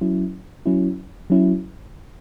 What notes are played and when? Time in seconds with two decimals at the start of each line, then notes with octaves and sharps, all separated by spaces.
0.01 F#3 C#4 E4
0.66 F#3 C#4 E4
1.30 F#3 C#4 E4